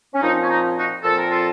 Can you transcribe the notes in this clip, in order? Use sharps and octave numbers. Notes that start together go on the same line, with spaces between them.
C#4
A#2 F3 C4 D#4
C#4
D#4
D#4 F#4
A#2 F3 C4 A4
A#4
F4 A4